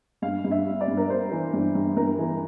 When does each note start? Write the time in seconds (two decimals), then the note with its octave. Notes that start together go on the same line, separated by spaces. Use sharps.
0.22 G2 F5
0.44 G2
0.51 E5
0.66 G3
0.81 D5
0.88 G2
0.97 A#4
1.10 G3 C5
1.32 E3
1.53 G2
1.75 G2
1.97 G2 A#4
2.19 E3